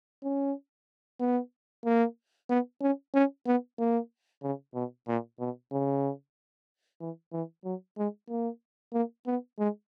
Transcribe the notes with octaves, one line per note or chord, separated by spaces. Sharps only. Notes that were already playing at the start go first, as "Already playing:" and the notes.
C#4
B3
A#3
B3
C#4
C#4
B3
A#3
C#3
B2
A#2
B2
C#3
E3
E3
F#3
G#3
A#3
A#3
B3
G#3